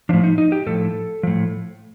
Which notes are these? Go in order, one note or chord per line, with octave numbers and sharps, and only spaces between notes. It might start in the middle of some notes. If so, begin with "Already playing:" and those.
A2 F3 D4
D#4
D#4
G4
A2 F3 A4
A2 F3